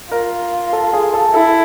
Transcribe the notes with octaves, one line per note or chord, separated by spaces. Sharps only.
F4 A#4
A4
G#4
A4
E4 A4